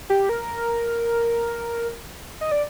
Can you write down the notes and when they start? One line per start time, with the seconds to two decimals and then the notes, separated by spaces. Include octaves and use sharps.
0.10 G4
0.29 A#4
2.41 D#5
2.52 D5